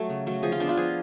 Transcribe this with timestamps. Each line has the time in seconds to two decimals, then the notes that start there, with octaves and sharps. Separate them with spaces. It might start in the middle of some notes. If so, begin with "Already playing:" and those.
Already playing: F#3 A3 A4
0.10 C#3
0.26 F#3 A3
0.43 F3 G#4
0.52 F4
0.60 B3 D4
0.69 F4
0.77 F3 G#4